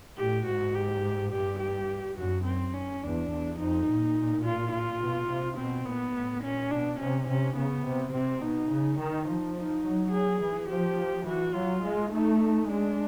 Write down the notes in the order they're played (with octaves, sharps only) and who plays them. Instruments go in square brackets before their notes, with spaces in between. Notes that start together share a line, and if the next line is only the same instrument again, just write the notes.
[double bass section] A2 [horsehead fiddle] G4
[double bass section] G#2 [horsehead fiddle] F#4
[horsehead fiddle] G4
[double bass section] G2 [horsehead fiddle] G4
[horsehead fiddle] G4
[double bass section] F#2 [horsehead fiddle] F#4
[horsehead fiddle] C4
C#4
[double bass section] E2 [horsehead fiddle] D4
[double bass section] E2
[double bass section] F2 [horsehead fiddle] D#4
[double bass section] A#2
[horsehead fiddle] F4
F4
[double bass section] B2
C3
[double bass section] B2 [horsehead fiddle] C4
[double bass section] A#2 [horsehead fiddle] B3
[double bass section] A2
[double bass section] A#2 [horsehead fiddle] C#4
[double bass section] B2 [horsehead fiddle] D4
[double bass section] C3 [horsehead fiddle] C#4
[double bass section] C3 [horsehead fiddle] C#4
[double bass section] C#3 [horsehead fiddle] B3
[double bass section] C3
[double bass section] C3 [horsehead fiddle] C4
[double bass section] B2 [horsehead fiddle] D#4
[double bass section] C#3
[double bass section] D#3 [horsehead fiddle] D#4
[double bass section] F3
[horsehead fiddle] D#4
[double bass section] F#3
[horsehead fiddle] G#4
[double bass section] E3
[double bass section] F3 [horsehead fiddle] G4
[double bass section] E3 [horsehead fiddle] F#4
[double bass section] F#3 [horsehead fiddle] F4
[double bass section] G#3
[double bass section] A3 [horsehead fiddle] D#4
[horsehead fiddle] D#4
[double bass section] G#3 [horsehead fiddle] D4